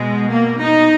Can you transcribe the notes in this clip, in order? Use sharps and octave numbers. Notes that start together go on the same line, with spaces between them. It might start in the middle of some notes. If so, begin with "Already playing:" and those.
Already playing: B2 G#3
A#3
D#4